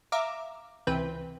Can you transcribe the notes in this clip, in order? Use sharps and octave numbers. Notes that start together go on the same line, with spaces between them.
E5 F5 A#5 D6
C#2 C3 E3 C4 B4 G5